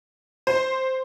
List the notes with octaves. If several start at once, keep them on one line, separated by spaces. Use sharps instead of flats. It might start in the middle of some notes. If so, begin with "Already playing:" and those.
C5